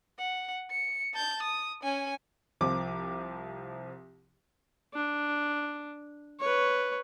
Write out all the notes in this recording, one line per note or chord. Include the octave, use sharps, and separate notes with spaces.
F#5
C#7
A5 G6
D#6
C#4 G#5
C2 F3 D6
D4
B4 C#5